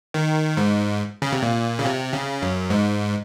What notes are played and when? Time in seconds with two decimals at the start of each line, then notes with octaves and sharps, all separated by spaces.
0.14 D#3
0.57 G#2
1.22 C#3
1.32 C3
1.42 A#2
1.79 C#3
1.85 C3
2.13 C#3
2.42 F#2
2.70 G#2